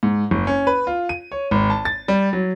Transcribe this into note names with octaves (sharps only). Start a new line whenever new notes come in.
G#2
F#1
C#4
B4
F4
D#7
C#5
G#1
A5
A6
G3
F#3